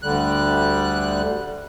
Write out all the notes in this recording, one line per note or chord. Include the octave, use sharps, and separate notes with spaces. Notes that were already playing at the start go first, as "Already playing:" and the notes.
D2 D3 G3 F#6